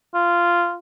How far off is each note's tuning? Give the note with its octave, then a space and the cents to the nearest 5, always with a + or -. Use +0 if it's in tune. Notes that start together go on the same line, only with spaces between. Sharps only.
F4 -10